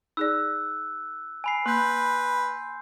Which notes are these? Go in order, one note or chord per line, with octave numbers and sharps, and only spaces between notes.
D#4 G#4 D5 E6 F#6
G#5 B5 C7
A#3 B4 C6 G6